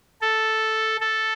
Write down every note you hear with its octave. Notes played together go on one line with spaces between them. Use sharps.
A4
A4